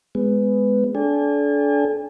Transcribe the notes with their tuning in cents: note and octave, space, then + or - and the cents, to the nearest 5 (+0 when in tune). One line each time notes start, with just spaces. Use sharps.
G#3 +0 B3 +15
D4 -25 A4 -35 G#5 -45